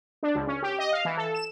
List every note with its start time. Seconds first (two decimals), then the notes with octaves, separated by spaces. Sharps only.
0.23 D4
0.35 C#2
0.47 C#4
0.62 G4
0.79 D#5
0.92 F5
1.05 E3
1.17 A4
1.34 E7